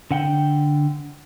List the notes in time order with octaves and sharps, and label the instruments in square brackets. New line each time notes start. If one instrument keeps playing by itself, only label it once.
[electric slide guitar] D3 F#5 G5